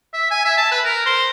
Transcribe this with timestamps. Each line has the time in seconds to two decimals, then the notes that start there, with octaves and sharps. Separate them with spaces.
0.14 E5
0.31 G#5
0.45 E5
0.57 A5
0.71 B4
0.85 A#4
1.06 C5